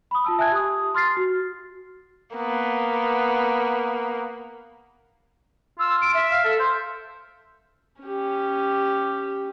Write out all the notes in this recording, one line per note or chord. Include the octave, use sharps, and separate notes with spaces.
B5 D#6
F4 A5 E6
E5 G#5 A5 F#6 G#6
G4 D#6
C6 F6 A6 C7
F#4
A#3 B3
F4 E6
D7
E5
F5
A4
C5
C#4 G4